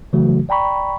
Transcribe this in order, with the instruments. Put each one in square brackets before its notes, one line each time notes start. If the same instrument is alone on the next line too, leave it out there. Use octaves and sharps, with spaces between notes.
[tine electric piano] C#3 E3 F#3 A3 F#4
D5 G5 A#5 B5 C#6